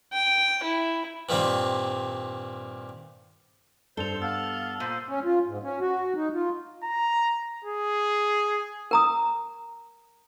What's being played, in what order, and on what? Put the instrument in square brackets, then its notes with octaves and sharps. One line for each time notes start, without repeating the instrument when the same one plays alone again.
[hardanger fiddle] G5
E4
[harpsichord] G2 A#2 D#3 G3 C4
[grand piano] G2 [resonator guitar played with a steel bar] A4 [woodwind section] C5 [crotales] F7 G7
[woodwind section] B3 F5 A5 [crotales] E6
[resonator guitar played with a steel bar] A#2 [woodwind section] C5
[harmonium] C#4
F4
G#2
C#4
F#4
D#4
F4
[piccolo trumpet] A#5
G#4
[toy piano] A#4 A#5 D#6